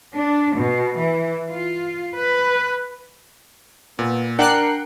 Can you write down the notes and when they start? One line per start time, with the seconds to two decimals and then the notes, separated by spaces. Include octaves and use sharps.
0.15 D4
0.55 B2
0.96 E3
1.49 F4
2.15 B4
3.99 A#2 B3
4.39 D4 A#4 F#5 G5 F#6 C7